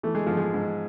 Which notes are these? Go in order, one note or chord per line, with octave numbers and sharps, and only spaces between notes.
E3 A3
G#3
G#2 F3
G#3
G#2